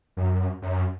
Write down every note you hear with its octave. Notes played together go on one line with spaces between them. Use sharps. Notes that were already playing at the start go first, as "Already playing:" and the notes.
F#2
F#2